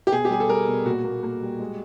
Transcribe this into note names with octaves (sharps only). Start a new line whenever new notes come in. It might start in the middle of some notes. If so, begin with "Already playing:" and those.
G4
B2 G#4
G4
G3 G#4
A4
G3 A#4
B2
A#2 F#4
A#3
A#3
G3
G#3